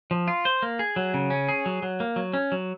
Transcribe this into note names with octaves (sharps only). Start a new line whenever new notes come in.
F3
F4
C5
A#3
G#4
F#3
C#3
C#4
G#4
F#3
F#3
A#3
F#3
C#4
F#3